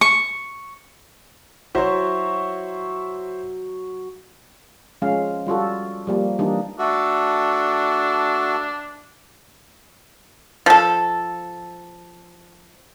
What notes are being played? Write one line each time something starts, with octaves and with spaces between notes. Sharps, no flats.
C#6
F#3 E4 C5 C#5 E5
F3 G#3 C#4 F5
G3 F4 F#4 A4
F3 G3 A#3
E3 G3 A#3 D4 D#4
A3 D4 F#4 A4
F3 A4